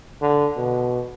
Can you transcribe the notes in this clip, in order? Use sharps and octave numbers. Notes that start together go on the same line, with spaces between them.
D3
B2